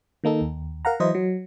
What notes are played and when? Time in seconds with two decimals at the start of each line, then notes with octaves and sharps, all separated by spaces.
0.24 D#3 A#3 D#4 A4
0.41 D#2
0.85 A#4 F5 F#5 A#5
1.00 E3 F#3 E4 C5 D#5
1.15 F#3